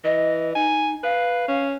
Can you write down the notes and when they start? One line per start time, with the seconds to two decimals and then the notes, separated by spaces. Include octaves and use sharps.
0.04 E3 D#5
0.55 D#4 G#5
1.03 B4 F5
1.48 C#4